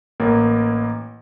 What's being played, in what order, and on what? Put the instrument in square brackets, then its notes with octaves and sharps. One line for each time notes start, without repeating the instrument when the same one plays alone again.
[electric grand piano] A1 A#3